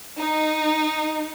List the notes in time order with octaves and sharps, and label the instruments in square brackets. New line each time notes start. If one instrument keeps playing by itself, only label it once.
[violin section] D#4